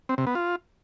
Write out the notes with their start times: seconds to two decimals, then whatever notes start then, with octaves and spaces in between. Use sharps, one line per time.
0.09 C4
0.18 C3
0.27 B3
0.35 F4